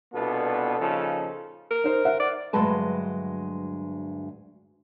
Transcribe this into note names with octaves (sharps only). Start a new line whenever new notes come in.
C2 B2 B3 D4 F4 A4
A#2 C#3 F3 D#4 A4
A#4
D#4 C5
C5 E5 F#5
D5
D2 G2 F#3 G#3 B4 A5